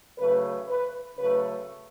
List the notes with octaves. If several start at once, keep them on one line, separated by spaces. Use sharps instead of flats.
C#3 F#3 A3 B4
B4
C#3 F#3 A3 B4